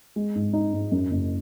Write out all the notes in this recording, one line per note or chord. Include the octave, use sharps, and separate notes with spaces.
G#3
G#2
D#4
G#2
F#2
F#1